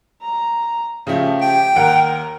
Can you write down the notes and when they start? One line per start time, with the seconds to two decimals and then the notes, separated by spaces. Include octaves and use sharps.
0.22 A#5
1.07 C#3 F3 A3 G4
1.41 G4 G5
1.76 D#2 A#4 F#5 D7